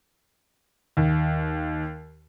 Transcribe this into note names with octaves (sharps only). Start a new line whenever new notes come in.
D#2